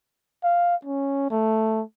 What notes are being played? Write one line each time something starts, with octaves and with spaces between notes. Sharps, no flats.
F5
C#4
A3